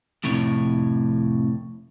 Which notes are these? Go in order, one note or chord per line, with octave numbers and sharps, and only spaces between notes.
F2 A2 C3 C#5